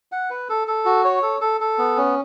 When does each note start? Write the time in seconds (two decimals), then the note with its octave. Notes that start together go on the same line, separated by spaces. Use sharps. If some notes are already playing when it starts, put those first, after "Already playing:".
0.12 F#5
0.30 B4
0.49 A4
0.67 A4
0.85 F#4
1.05 C#5
1.22 A4
1.41 A4
1.61 A4
1.78 B3
1.97 C#4